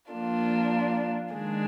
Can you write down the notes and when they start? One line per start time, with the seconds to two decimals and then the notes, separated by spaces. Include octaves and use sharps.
0.11 F3 A#3 D4 F4
1.32 D#3 G#3 D4 G#4